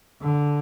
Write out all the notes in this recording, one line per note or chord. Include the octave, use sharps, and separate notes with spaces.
D3